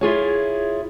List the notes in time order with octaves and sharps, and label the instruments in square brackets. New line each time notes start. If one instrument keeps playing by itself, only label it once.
[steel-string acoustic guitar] E4 F4 G#4 C#5